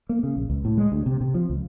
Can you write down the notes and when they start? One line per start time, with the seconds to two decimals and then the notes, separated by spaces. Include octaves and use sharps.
0.09 A#3
0.23 C#3
0.37 A#1
0.50 C#2
0.65 A2
0.78 G#3
0.92 D2
1.06 C3
1.21 C3
1.34 F3
1.50 C#2